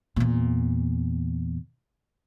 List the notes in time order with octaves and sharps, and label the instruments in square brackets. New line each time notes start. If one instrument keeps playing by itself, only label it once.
[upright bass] E2 A#2